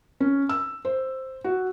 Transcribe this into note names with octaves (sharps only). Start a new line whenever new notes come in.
C#4
E6
C5
F#4